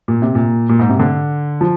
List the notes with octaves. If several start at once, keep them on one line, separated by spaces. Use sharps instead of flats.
A#2
C3
A#2
A#2
G#2
C3
D3
F3